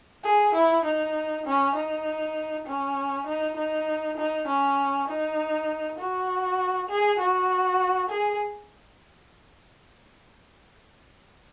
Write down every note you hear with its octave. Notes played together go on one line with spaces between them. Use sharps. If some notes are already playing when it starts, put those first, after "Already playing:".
G#4
E4
D#4
C#4
D#4
C#4
D#4
D#4
D#4
C#4
D#4
F#4
G#4
F#4
G#4